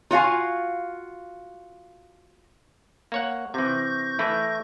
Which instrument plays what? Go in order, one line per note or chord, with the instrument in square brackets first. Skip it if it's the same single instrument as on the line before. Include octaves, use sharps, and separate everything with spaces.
[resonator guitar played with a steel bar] F4 F#4 F5 G#5
[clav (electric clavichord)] A#3 C#5 F#5
[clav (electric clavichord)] C3 E3 [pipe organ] C#6 G6 A#6
[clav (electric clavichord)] E3 A3 E4